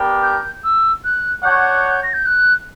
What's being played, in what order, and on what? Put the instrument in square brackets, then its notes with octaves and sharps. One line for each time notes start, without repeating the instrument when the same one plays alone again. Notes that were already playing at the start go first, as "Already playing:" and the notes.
Already playing: [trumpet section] B3 D4 G4 A#4
[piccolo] G6
E6
F#6
[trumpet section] D4 F#4 C#5 F#5 [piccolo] G6
[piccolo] A#6
G6
F#6